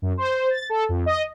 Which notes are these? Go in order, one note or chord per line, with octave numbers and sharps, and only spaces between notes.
F#2
C5
A6
A4
F2
D#5